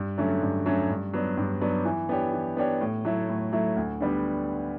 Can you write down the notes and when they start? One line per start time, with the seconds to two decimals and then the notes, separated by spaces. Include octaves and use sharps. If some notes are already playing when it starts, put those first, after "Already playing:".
Already playing: G2
0.18 D3 F#3 A3 C#4
0.42 G2
0.66 D3 F#3 A3 C#4
0.89 G2
1.13 F#3 B3 D4
1.37 G2
1.61 F#3 B3 D4
1.85 E3
2.09 B3 D4 G4 C#5
2.33 E3
2.57 B3 D4 G4 C#5
2.81 A2
3.05 F#3 A3 E4
3.29 A2
3.53 F#3 A3 E4
3.76 D2
4.00 D3 G3 B3